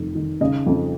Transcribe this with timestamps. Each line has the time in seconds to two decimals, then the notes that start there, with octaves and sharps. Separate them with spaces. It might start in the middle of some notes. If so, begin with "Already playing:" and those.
Already playing: F1 F2 D#3
0.15 D#3
0.41 C#3 D#5
0.66 F2